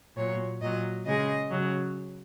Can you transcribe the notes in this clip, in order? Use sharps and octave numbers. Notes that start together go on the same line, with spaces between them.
A#2 F#3 C#5
A#2 F#3 D#5
C#3 G#3 D#5
C#3 F#3